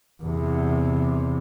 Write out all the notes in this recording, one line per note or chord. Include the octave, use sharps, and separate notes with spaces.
E2 C3